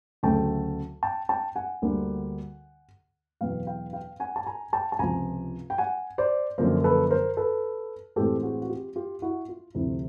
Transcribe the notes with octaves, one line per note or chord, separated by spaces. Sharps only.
D2 C#3 F#3 A3 G5 A5
G5 A5
G5 A5
F#5 G#5
D2 D3 G3 A#3
E2 B2 F#3 B3 F5 G5
F5 G5
F5 G5
F#5 G#5
A5
G#5 A#5
G5 A5
A5
C#2 C3 F3 G#5 A#5
G5
F#5 G#5
C5 D5
F#2 D3 F3 A#3 A#4 C5
A4 B4
A#4 C5
A4 B4
A2 E3 G#3 C4 G4 A4
F#4 G#4
F#4
F4 G4
F4 G4
E4 F#4
F4
D2 C3 F3 A3 C4 E4